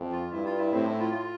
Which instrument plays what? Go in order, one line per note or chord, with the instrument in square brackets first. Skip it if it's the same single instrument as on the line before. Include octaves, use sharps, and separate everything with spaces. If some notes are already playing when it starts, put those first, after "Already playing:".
Already playing: [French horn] F2
[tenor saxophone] F4
[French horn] G2 [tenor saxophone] E4
[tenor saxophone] F4
E4
[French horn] A2 [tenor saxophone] C4
[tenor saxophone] E4
F4
F4